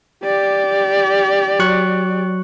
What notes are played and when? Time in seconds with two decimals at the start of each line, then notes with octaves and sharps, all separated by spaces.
0.23 G4 D5
1.59 F#3 C#6 F#6